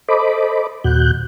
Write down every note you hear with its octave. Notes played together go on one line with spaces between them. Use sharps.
A4 C5 D#5 B5 D6
D#2 A#2 F#4 F#6 G6